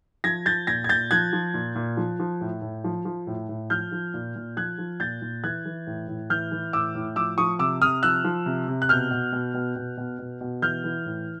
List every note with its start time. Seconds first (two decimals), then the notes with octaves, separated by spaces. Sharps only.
0.24 F3 G#6 A#6
0.46 F3 G6 A6
0.67 A#2 G#6 A#6
0.84 G#6
0.89 A#2 G6 A6
1.11 F3 F#6 G#6
1.33 F3
1.54 A#2
1.75 A#2
1.97 F3
2.20 F3
2.41 A2
2.62 A2
2.84 F3
3.05 F3
3.27 A2
3.49 A2
3.70 F3 F6 G6
3.92 F3
4.14 A#2
4.36 A#2
4.57 F3 F#6 G#6
4.78 F3
5.00 A#2 G6 A6
5.22 A#2
5.43 E3 F#6 G#6
5.65 E3
5.87 A2
6.08 A2
6.30 E3 F6 G6
6.52 E3
6.73 A2 D6 E6
6.95 A2
7.16 F3 D6 E6
7.38 F3 C#6 D#6
7.59 C3 D6 E6
7.81 C3 D#6 F6
8.03 F3 E6 F#6
8.24 F3
8.46 C3
8.68 C3
8.82 F#6
8.89 B2 F6 G6
9.11 B2
9.32 B2
9.54 B2
9.76 B2
9.97 B2
10.19 B2
10.41 B2
10.62 E3 F6 G6
10.84 E3
11.06 A2